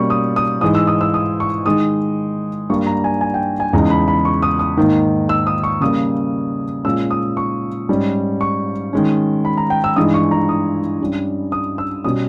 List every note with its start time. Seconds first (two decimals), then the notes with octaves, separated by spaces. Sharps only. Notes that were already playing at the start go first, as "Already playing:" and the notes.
Already playing: B2 G3 A#3 C#4 C#6
0.10 D#6
0.36 D#6
0.61 G#2 E3 G#3 D#4 D#6
0.75 E6
0.87 D#6
1.01 E6
1.14 D#6
1.40 C#6
1.66 D#3 G#3 D#4 D#6
2.70 G2 G3 A#3 C#6
2.87 A#5
3.04 G#5
3.21 G#5
3.34 G5
3.60 G#5
3.73 E2 C#3 G#3 D#4 A#5
3.90 B5
4.08 B5
4.25 C#6
4.42 D#6
4.59 D#6
4.77 G#2 D#3 A#3 D#4
5.29 E6
5.47 D#6
5.64 C#6
5.81 C#3 G3 A#3 D#6
6.85 A#2 G#3 C#4 E6
7.10 D#6
7.37 C#6
7.89 G#2 G3 C#4
8.41 C#6
8.93 D#3 G#3 C#4
9.45 B5
9.57 A#5
9.70 G5
9.84 E6
9.96 G2 E3 G#3 D#4 D#6
10.14 C#6
10.31 A#5
10.49 D#6
11.00 G2 G3 C#4
11.52 D#6
11.78 E6
12.04 B2 G3 C#4 D#6